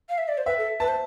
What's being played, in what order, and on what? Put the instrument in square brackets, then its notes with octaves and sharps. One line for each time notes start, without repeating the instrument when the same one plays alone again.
[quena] F5
E5
D5
C5
[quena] B4 [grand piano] E5
[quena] A4
[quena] B4 [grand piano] A5
[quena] C5